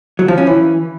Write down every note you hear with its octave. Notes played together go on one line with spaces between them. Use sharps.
F#3
F3
C#4
E3